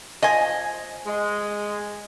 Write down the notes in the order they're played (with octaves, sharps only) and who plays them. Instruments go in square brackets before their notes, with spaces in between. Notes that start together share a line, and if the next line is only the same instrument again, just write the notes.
[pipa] F3 G#5 [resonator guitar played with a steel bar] D#5
[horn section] G#3